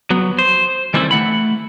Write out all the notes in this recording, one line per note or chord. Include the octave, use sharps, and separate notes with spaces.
F#3 B3
C5
D#3 E3 G3 A3 C4 E4
A3 F#5 B5